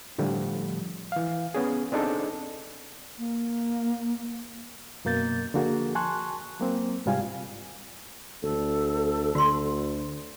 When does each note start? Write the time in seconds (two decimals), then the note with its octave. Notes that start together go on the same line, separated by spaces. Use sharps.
0.18 A2 D3 F3 G3 A3
1.12 E3 F5
1.55 B3 C#4 G#4
1.92 C4 D4 D#4 G#4 A4
3.18 A#3
5.05 F#2 B2 A#3 G6 A6
5.54 D3 F3 A#3 F#4 G#4
5.95 G#5 A5 C6 C#6 F#6
6.60 F#3 A#3 C4
7.06 G#2 C3 G3 F4 F5 G#5
8.43 D2 A4
9.35 D2 D3 F#4 C6